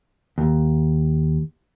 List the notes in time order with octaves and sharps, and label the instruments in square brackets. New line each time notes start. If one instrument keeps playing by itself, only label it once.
[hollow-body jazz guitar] D#2